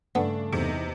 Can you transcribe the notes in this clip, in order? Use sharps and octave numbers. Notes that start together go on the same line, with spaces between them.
G2 C#3 A3 B3 D4
E2 C3 D#4